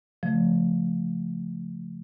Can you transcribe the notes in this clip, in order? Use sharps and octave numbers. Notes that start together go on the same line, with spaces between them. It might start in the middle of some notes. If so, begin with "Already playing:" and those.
C#3 F3 A3